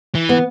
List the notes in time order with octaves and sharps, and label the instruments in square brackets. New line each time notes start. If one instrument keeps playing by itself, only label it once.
[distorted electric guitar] E3
[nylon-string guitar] B3